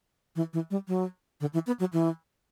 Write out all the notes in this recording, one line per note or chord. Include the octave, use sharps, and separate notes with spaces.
E3
E3
G3
F#3
D3
E3
B3
F#3
E3